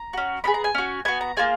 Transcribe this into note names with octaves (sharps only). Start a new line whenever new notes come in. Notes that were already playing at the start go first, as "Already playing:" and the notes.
Already playing: A#5
C#4 F#4
B3 D#4 G#4 B5
A#5
G#5
C#4 F#4
B3 F#4 G#5
A#5
A#3 F4 G#4 G#5